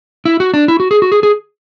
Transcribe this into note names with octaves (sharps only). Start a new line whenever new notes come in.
E4
F#4
D4
E4
F#4
G#4
F#4
G#4
G#4